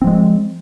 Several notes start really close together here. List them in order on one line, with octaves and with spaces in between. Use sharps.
C4 F3 G#3